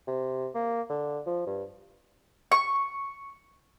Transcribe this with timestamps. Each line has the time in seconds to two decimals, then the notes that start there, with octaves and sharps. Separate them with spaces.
0.07 C3
0.55 A#3
0.90 D3
1.27 F3
1.47 G2
2.52 C#6